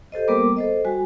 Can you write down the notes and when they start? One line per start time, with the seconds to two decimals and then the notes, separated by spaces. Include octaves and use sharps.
0.12 G4 A4 C5 D#5
0.28 G3 A#3 B3 A#4 D6
0.57 A4 C5 D#5
0.85 G3 F#4 G#5